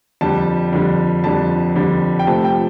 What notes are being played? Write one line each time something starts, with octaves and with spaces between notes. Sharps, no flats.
F2 D3 G3 A5
F2 D3 G3
F2 D3 G3 A5
F2 D3 G3
G5
C3 F3 A3 A5
G5